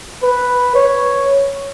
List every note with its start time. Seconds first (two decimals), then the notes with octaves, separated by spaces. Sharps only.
0.23 B4
0.76 C#5